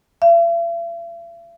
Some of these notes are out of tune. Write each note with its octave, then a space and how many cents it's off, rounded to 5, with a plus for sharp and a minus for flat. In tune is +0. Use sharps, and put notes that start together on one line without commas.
E5 +45